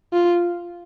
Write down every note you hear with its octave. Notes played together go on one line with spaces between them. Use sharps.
F4